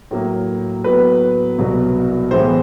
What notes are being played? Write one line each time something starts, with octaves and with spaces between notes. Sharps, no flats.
A2 F#3 A#3
A2 F#3 B3 B4
C2 B2 F#3
A2 E3 G#3 B3 C5